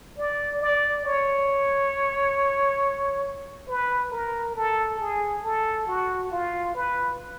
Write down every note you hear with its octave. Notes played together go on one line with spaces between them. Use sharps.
D5
D5
C#5
B4
A#4
A4
G#4
A4
F#4
F4
B4